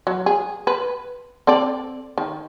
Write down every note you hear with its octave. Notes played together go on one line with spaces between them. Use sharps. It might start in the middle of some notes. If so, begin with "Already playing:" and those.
F#3
G#4
B4
C4 A4 D5
D#3